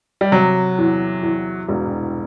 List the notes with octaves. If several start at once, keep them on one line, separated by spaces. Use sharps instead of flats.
G3
C3 F#3
E2
E2
E1